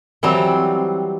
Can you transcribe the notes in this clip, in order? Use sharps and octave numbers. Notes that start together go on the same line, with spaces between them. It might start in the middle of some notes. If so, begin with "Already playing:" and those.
E3 F#3 G3 C4